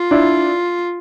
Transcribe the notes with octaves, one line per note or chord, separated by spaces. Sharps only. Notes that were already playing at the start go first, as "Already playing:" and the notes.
Already playing: F4
D4 E4